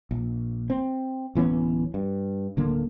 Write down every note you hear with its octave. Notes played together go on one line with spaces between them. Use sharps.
A#1
C4
D1 E3 B3 C#4
G2
D1 D3 A#3